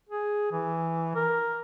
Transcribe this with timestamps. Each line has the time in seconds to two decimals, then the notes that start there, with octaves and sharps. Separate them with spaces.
0.09 G#4
0.52 E3
1.16 A#4